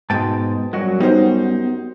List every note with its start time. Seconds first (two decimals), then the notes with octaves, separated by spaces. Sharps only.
0.10 G#2 B2 G#3 G5 A5
0.73 F#2 F#3 G3 F#4 D#5
1.00 G3 B3 D#4 C5